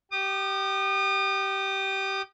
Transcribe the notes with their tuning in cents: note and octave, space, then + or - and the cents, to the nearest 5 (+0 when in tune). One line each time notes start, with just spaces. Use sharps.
G4 -20 D#6 -45